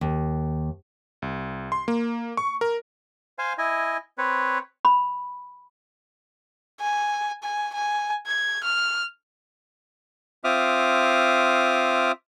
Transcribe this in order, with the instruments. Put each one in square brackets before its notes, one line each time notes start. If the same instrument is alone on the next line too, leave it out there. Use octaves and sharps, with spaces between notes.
[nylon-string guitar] D#2
[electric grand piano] C2
C6
A#3
C#6
A#4
[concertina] C5 F5 G#5
E4 D#5 G#5
C4 B4 C#5
[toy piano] B5
[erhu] G#5
G#5
G#5
G#6
F6
[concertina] C4 F4 E5 D6 D#6 F6